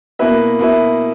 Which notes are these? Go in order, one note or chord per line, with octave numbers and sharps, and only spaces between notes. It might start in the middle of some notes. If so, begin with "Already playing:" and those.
B2 A#3 E4 B4 E5
B2 A#3 E4 B4 E5